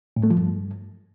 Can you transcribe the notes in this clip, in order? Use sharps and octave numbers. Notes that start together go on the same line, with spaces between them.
A2
A3
F3
G2